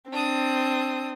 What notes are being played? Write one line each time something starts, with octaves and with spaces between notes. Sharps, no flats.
C4 D4 D#6